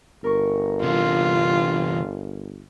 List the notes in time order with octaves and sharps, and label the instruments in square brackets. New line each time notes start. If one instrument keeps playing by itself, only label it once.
[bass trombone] G1 [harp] A#4 C#6
[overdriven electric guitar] C3 E3 [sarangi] F4